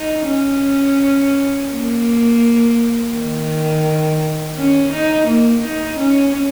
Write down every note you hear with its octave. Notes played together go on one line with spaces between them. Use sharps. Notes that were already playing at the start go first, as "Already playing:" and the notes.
Already playing: D#4
C#4
A#3
D#3
C#4
D#4
A#3
D#4
C#4